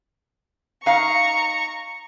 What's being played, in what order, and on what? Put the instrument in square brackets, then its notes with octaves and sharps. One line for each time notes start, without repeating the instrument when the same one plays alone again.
[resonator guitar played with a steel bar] D#4 F5 [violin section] A#5 C#6